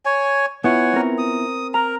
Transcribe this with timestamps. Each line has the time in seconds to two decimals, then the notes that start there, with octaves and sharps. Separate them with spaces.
0.05 C#5 G#5
0.64 B3 E4 F4 C#5 F#5 G#5
0.93 C4 A#4
1.18 D#6
1.74 A#4 A#5